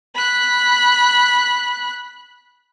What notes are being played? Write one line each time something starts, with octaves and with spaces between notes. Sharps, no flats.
B5 F#6